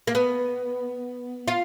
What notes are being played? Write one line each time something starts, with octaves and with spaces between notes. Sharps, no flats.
A#3
B3
F4